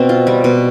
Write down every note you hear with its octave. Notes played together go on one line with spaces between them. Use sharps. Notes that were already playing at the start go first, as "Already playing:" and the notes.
Already playing: B2 C4
F4
G3
B2